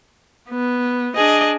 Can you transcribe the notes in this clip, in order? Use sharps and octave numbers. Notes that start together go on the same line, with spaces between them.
B3
D4 G#4 D#5